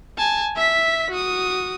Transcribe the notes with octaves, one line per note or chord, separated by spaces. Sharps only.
G#5 A5
E5 B6
F#4 D#6